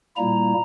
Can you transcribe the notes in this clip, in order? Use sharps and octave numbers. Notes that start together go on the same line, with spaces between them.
A#2 G3 A#3 E4 A#5